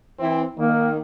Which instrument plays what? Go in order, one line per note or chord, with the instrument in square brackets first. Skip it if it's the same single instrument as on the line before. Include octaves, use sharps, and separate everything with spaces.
[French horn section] E3 C4 E4
[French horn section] D#3 [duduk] A#3